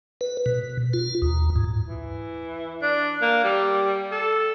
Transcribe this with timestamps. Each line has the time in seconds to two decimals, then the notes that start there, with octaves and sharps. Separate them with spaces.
0.21 B4
0.46 B2
0.93 F4
1.22 D#2
1.56 G#2
1.84 E3
2.82 D4
3.22 A#3
3.44 G3
4.12 A4